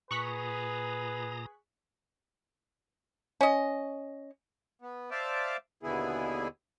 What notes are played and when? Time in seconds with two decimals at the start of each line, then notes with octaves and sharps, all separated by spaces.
0.11 A#2 G#4 B4 A#5 C#6 D#6 F#6 B6
3.41 C#4 D#5
4.82 B3
5.11 C5 D5 E5 F5 A5 D6
5.83 D#2 B2 D3 B3 E4 G#4